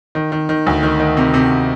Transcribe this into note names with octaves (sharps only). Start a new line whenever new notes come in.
D#3
D#3
D#3
D2
D#3
D#3
C3
C3